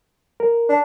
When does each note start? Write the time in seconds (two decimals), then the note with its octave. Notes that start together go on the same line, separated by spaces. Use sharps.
0.40 A#4
0.69 D4